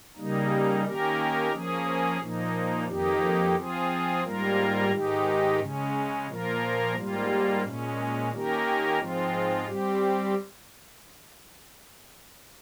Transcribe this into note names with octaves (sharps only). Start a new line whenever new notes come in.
C#3 G3 A#3 D#4
D#3 A#3 C#4 G4 A#4
F3 A#3 C#4 G#4
A#2 F3 A#3 D#4
F2 D#3 A#3 D#4 G4
F3 C4 F4 G#4
G#2 G3 A#3 F4 A#4
G#2 D#3 G#3 D#4 G4
C#3 G#3 C#4
A#2 F3 A#3 F4 A#4
G#2 G3 A#3 F4
A#2 G#3 C#4
D#3 A#3 C#4 G4 A#4
G#2 F3 G#3 C4 F4
G3 C4 G4